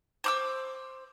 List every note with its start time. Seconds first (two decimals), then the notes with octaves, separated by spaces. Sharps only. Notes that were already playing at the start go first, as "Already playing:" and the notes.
0.24 C5 D6 E6